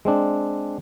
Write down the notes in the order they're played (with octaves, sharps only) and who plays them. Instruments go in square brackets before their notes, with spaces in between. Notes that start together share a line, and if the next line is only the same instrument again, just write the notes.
[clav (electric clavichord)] G#3 C4 D4